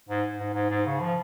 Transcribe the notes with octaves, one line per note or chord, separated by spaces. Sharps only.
G#2
G#2
G#2
G#2
C#3
F3